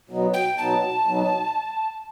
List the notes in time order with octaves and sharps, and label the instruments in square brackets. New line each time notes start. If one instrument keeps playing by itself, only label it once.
[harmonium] B2 F#3 B3 D#4
[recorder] G5
[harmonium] B2 F#3 B3 D#4 [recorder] A5
[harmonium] B2 F#3 B3 D#4